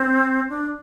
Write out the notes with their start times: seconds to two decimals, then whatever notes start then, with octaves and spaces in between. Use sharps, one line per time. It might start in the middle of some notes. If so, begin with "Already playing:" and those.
Already playing: C4
0.49 D4